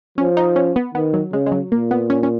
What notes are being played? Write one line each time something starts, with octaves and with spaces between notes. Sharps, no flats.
F3 C#4
D#4
C#4
B3
D#3 B3
F#3
C#3 G#3
G#3
F#3
A#2 A#3
B3
C#4
C#4